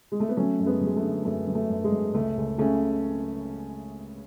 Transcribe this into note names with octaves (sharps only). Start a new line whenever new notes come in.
G#3
A3
B3
F#3 A3 C#4
F#2
G#3 B3
F#3 G#3
A3
D3
F#2 A3
F#3
A3
F#2
G#3
F#2
C#2 A3
C#2
C#3 A3 C#4